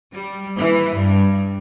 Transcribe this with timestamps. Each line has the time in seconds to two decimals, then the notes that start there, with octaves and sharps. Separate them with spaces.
0.12 G3
0.59 E3
0.97 G2